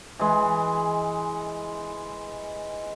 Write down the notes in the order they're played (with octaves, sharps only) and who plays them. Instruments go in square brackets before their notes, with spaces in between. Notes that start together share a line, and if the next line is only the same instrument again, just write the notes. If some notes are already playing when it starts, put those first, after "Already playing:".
[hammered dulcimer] E3 G#3